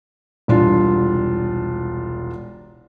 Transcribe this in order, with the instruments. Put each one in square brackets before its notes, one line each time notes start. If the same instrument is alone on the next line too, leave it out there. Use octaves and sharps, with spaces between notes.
[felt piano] E1 C2 D4 F4